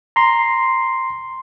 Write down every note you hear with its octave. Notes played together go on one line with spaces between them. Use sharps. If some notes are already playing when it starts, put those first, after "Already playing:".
A#5 C6